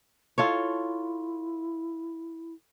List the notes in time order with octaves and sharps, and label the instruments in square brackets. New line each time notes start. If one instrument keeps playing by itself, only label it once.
[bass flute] E4 [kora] F4 A4 C#5